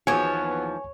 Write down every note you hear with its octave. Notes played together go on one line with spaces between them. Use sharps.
D#2 E3 F3 B3 F#4 G#4 C#5 G#5